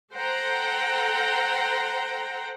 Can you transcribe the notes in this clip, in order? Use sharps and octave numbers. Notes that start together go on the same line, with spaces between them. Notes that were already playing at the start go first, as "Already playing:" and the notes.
A4 C5 F#5 G5 A#5